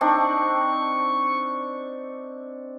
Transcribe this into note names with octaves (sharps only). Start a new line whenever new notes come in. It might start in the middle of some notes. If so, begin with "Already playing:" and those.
C4 D4 D#4 C#6